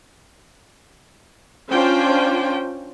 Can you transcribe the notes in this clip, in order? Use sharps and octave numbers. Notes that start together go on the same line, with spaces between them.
C#4 D4 F4 C5 G5